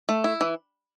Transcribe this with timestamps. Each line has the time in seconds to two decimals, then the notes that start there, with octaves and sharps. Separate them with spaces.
0.09 A3
0.24 E4
0.41 E3